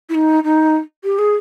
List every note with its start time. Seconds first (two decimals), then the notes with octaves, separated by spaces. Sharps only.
0.09 E4
0.14 D#4
0.44 D#4
1.04 G4
1.18 G#4